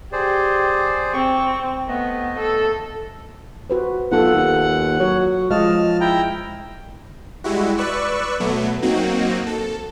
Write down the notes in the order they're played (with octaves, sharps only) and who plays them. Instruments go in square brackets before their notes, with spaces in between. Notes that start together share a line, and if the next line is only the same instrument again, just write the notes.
[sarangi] G4 [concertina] G#4 C5 D5
[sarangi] C4 [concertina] C#6
[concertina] A3 D#5 [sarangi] B3
[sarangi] A4
[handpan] F#4 B4 C5
[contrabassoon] B1 [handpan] F4 A4 [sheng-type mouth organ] F#5
[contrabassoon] D#2
[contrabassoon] F#3 [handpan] C#5
[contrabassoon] F3 [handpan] G#3 D#5 F5 [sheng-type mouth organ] A5 F6
[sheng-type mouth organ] E4 G5 A#5
[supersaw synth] G3 G#3 E4 F#4
B4 D5 C#6 E6 F#6
B2 F#3 A3 B3
F#3 A#3 C4 D#4 F#4
A4